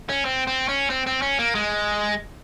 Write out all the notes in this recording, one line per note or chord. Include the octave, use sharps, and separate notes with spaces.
C#4
C4
C4
C#4
C4
C4
C#4
A#3
G#3